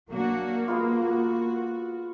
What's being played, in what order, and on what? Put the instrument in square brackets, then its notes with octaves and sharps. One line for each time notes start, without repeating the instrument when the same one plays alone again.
[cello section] F#3 D4 F#4 [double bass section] A#3
[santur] G#3 B3 F4 [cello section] F#4